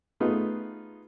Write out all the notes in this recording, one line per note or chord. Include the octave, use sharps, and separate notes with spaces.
A3 B3 D#4 F4 G#4 B4